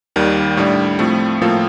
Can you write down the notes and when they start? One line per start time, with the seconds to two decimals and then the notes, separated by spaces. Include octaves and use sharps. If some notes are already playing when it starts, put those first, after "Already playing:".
0.16 D#2 D#3 G3
0.57 A2 G3 D4
0.99 A2 F3 A3 C4
1.41 A2 F3 A#3 F4 A4